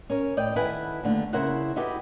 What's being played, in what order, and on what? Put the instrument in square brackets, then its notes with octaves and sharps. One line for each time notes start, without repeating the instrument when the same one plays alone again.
[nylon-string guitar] C#4 A#4 C#5
A2 D5 D#5 G5
D#3 E4 A4 B4 F#5 G#5
D#2 D3 A3
C#3 E4 A#4 C5 F#5
D#4 E4 F#4 G4 A4 B4